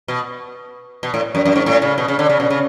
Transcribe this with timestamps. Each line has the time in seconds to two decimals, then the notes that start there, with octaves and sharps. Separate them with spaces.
0.08 B2
1.03 B2
1.14 A2
1.35 F#2
1.45 F#2
1.56 G#2
1.66 A2
1.82 C#3
1.98 B2
2.08 C#3
2.19 D3
2.29 C#3
2.40 B2
2.50 C#3